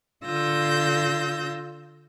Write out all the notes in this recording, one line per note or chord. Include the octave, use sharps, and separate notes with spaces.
D3 F4 E6 G6 A#6